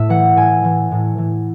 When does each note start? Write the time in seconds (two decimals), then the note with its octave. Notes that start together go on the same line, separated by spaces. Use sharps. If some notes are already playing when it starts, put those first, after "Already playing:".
Already playing: A2 E5
0.09 E3 F#5
0.36 A2 G#5
0.64 E3
0.92 A2
1.18 E3